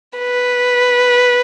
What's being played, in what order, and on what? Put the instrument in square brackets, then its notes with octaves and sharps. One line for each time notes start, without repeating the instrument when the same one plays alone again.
[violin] B4